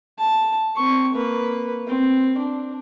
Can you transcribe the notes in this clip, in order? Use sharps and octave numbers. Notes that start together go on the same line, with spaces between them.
A5
C4 C#6
A#3 B4
C4
D4